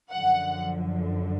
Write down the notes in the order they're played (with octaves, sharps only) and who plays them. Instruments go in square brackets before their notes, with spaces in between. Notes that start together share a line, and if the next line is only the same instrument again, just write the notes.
[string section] F#2 D3 F3 F#5